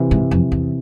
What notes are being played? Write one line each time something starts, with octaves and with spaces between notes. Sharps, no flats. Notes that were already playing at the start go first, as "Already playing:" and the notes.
Already playing: C3 E3
G#2
F2
E2